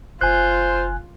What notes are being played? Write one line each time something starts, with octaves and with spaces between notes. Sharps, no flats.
F#1 F4 C5 G#5 F#6